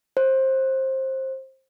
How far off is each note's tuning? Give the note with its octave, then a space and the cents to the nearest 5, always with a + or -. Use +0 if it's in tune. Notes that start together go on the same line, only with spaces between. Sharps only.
C5 +20